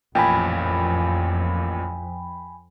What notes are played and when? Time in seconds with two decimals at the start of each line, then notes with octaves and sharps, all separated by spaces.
0.15 A1 F2 A#2 G5 G#5 B5